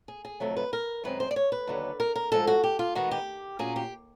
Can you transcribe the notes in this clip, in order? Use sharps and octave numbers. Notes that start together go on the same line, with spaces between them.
G#4
G#4
F2 C3 D#3 F#3 A3 A4
B4
A#4
F#2 D#3 G#3 C4 B4
C5
D5
C#5
B4
D#2 D3 F#3 B3
A#4
A#4
G#2 F3 G#3 A4
F#4
G4
F4
D#3 G#3 B3 F#4
G4
A#2 F#3 A#3 C#4 G#4
G4